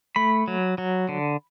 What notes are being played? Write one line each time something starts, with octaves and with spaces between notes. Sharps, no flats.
A3 B5
F#3
F#3
D3